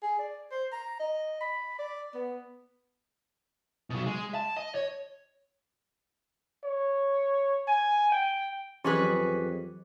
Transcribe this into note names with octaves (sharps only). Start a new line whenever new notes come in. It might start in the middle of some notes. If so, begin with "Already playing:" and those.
G#4
D5
C5
A#5
D#5
B5
D5
B3
B2 F#3
G#3
A5
D#5
C#5
C#5
G#5
G5
F2 E3 F#3 C#4 G4 G#4 B4 B6